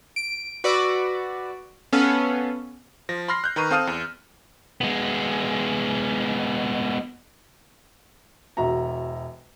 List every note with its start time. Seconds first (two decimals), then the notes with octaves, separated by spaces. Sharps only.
0.16 D7
0.64 F#4 B4 D5 B5 D6 E6
1.93 B3 C#4 A4 F5
3.09 F3 A#6
3.28 B5 C6 F6 A#6 C7
3.44 F#6 G6
3.56 D#3 B4 A#5 C#6 D#7
3.71 C4 A4 F5 D#6 F6 D#7
3.87 E2
4.81 G#3 B3
8.57 E1 F#4 E5 A#5